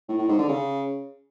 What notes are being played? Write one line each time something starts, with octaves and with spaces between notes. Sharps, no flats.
A2
A2
G#2
D3
C#3